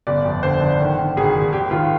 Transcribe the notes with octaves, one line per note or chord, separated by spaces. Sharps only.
G1 D5
F2
D3 C5
D3
D#3
D#3
G#1 G#4
G#1
G#1 G4
D#3 F4